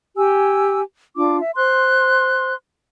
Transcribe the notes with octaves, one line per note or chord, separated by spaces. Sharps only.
G4 G#5 E6
D4 F4 D6
E5
C5 C6 F#6